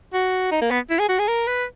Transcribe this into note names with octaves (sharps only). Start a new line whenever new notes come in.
F#4
D#4
A#3
B3
E4
G#4
F#4
G#4
A#4
B4